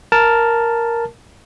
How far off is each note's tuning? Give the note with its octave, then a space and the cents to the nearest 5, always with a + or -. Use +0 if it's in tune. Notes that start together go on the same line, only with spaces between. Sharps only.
A#4 +0 A5 +0